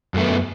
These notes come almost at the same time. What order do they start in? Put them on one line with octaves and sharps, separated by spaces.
F#2 A3 B3